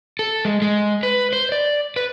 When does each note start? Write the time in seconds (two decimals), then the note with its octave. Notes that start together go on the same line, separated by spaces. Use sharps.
0.19 A4
0.45 G#3
0.62 G#3
1.03 B4
1.33 C5
1.52 D5
1.96 B4